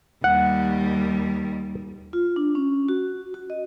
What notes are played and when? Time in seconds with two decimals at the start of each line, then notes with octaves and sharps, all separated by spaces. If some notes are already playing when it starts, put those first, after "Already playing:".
0.24 D#2 G3 F#5
2.13 F4
2.36 D4
2.55 C#4
2.89 F#4
3.34 F#4
3.50 D#5